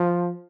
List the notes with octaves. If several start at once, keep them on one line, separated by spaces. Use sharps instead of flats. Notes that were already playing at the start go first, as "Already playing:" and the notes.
Already playing: F3